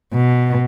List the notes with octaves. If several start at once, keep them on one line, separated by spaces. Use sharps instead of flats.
B2